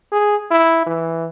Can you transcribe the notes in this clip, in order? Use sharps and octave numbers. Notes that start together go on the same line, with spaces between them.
G#4
E4
E3